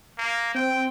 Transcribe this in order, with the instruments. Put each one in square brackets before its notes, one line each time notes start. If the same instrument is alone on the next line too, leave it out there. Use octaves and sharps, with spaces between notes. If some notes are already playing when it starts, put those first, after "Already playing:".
[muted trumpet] A#3
[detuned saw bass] C4 [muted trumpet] G5